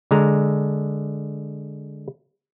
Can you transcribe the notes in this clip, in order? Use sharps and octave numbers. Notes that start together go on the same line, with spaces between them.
D3 G#3 A#5